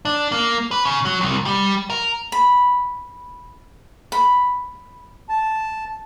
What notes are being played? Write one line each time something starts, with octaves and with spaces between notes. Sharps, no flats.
D4
A#3
B4
C#3
F#3
C2
G3
A#4
B5
B5
A5